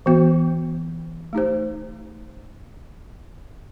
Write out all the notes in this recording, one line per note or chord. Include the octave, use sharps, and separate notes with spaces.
E3 B3 F#4
A3 D#4 G4 C5